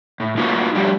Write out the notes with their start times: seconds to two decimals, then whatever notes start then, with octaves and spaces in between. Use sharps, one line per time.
0.20 A2
0.37 A3 A#3 D#4 F4 F#4 B4
0.75 F3 G3 A3 D4 G4